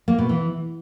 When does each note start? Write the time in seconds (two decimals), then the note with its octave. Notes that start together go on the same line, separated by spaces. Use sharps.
0.08 A#3
0.18 B2
0.29 E3